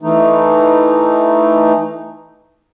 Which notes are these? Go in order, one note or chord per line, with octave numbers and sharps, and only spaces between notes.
E3 A3 D#4